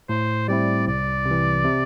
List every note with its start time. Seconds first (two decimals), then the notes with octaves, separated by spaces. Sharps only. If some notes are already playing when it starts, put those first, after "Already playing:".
0.09 A2 C5
0.48 G3 C4 E4 D5
0.87 C2 D5
1.26 C3
1.31 E3
1.64 C3